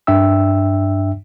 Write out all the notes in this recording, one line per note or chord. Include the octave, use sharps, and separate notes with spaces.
G2 D4 E5 G5 E6